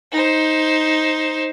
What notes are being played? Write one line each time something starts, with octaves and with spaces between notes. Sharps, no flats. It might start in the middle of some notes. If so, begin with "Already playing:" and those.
D#4 C5